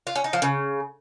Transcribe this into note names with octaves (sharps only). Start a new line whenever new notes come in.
F4
C#4
D#4
F3
C#3